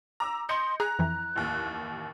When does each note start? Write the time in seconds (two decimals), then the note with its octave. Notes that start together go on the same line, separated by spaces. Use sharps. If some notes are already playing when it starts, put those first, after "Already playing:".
0.20 A#5 D6 E6
0.49 D#5 C6 G6 C#7
0.80 G#4 A#5 F#6
0.99 F2 E3
1.36 A1 D#2